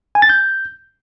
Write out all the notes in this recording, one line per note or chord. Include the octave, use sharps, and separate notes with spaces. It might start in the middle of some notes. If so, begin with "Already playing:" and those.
G#5
A6
G6